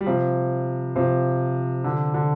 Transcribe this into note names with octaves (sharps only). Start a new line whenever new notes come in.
G3
C3 F3
C3 F3
D3
D3